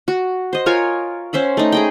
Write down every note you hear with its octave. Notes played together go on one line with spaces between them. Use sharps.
F#4
C5 D#5
F4 A#4 C#5 G#5
C#4 C5 E5 F#5
A3 D#4
G#4 D#5 G5